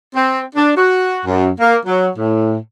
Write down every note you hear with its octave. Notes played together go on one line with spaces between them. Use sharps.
C4
D4
F#4
F#2
A#3
F#3
A2